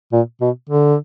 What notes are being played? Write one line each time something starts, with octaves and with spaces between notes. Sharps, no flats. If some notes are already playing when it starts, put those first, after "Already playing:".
A#2
B2
D3